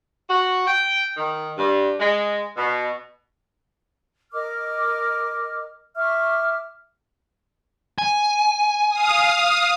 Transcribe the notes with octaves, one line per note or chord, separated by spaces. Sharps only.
F#4
G5
D#3
G2
G#3
B2
A#4 D#5 D6 F6
E5 C#6 D6 F6
G#5
F5 D#6